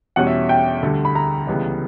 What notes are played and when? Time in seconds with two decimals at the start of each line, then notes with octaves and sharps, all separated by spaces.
0.16 E2 B2 G3 C#4 F#5
0.27 E5
0.49 G5
0.82 D2 D3 G3
1.05 B5
1.15 A#5
1.47 C#2 C#3 E3 G3 B3